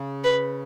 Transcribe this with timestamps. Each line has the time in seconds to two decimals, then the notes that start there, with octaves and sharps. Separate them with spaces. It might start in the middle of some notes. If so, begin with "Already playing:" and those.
Already playing: C#3
0.24 B4